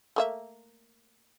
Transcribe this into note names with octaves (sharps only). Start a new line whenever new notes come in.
A3 A#3 E5